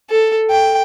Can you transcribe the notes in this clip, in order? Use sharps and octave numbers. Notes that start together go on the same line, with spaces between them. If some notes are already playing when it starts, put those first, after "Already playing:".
A4
G5